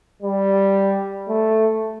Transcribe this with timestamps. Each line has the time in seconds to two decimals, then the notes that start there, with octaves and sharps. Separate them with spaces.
0.22 G3
1.29 A3